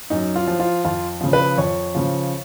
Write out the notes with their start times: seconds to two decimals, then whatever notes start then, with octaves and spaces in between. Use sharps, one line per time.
0.10 F#2 D#4
0.36 F4
0.48 F3
0.60 F4
0.85 F2 F4
1.21 C#3 F3
1.33 B4
1.57 F2 C#5
1.95 C#3 F3